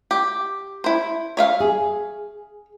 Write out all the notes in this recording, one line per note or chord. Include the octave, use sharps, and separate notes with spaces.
G4
E4 C5
C#5 E5 F5
G#4